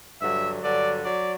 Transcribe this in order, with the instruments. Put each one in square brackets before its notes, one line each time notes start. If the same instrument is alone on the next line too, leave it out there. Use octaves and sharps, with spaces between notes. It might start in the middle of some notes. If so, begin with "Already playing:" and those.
[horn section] G2 D3 F#3 E5
G2 D3 F#3 D5
F#3 D5